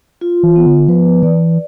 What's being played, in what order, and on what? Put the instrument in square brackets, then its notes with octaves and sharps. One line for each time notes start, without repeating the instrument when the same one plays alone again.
[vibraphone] F4
[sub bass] E3
[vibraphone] B3
[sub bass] D3
[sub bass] F3 [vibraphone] B4
[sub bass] E3 [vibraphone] D5